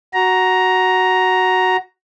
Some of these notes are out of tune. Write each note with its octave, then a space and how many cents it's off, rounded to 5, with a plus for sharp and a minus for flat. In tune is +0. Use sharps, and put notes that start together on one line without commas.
F#4 +0 A#5 +5